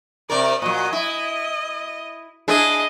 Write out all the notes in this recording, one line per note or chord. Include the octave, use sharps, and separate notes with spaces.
C3 A#4 D5
A#2 F#3 D#5
E4
D4 E4 G#4 D#5